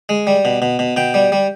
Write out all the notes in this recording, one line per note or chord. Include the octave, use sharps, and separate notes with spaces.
G#3
G3
B2
B2
B2
B2 G5
G3
G3